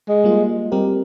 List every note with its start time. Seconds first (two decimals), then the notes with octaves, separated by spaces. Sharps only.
0.08 G#3
0.24 G3 A#3 F4
0.72 G3 C4 G4 A#4